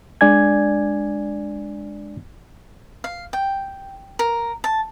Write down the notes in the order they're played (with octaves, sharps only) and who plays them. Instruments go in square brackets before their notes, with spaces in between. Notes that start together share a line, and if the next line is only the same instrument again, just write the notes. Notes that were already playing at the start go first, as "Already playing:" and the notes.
[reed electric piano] G#3 D4 D5 G#5 G#6
[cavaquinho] F5
G5
A#4
A5